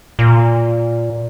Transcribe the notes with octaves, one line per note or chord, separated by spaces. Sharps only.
A#2